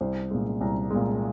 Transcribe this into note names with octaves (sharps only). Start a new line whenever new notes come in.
C2 C5
A#2 G#3
C2 A#5
A#2 G#3